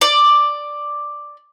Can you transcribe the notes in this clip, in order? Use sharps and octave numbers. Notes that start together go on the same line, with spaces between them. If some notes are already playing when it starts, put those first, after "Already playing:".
D5